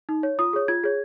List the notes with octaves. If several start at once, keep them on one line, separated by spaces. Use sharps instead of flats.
D#4
C#5
F4 D#6
G#4 C#5
F4 G#6
G#4 C#5